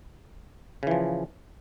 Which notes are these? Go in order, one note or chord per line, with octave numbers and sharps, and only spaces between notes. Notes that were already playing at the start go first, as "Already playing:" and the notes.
C#3 E3 F3